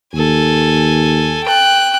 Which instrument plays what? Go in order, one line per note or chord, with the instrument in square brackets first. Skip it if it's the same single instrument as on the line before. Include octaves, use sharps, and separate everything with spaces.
[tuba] D#2 [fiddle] A4 G#5
[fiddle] G5 F#6